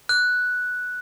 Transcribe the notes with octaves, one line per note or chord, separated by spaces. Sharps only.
F#6